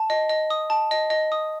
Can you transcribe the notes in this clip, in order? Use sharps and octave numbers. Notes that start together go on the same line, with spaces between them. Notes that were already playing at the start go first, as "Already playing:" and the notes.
Already playing: A5
D#5
D#5
D#6
A5
D#5
D#5
D#6